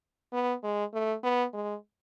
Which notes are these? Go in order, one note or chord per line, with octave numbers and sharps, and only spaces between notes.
B3
G#3
A3
B3
G#3